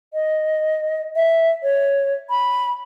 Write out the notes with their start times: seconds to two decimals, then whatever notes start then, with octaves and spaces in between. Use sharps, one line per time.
0.14 D#5
1.16 E5
1.63 C#5
2.30 B5